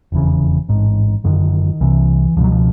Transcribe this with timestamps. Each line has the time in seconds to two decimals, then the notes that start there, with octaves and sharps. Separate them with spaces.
0.12 F1 E2 C#3
0.69 A1 G#2
1.24 F#1 F#2 D3 D#3
1.81 C2 C3 E3
2.37 C#2 F3
2.40 B2 F#3
2.52 F3